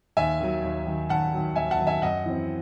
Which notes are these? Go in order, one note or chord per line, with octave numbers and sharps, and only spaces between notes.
D#2 E5 G#5
D#3 F#3
D#2
D#3 F#3
D#2 F#5 A5
D#3 F#3
D#2 E5 G#5
F#5 A5
D#3 F#3
E5 G#5
F#2 D#5 F#5
E3 C4